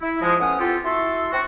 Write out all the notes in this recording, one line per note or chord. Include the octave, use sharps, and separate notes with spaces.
E4
F3 G#3
A2 B3 C#4 F#5 D#6
C4 F4 G4 A4
E4 F#4 A4 C6
C4 D4 F#4